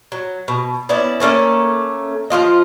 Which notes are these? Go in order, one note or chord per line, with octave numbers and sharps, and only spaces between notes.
F#3
B2
B3 C#4 E4 D5
A3 A#3 C#4 A4
F3 F#3 F4 D#5